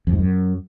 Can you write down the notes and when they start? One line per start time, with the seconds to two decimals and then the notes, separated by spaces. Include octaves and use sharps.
0.07 F2
0.13 G#2
0.19 F#2